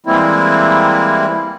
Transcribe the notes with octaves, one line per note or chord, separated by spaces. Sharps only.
E3 G3 G#3 A#3 C4 E4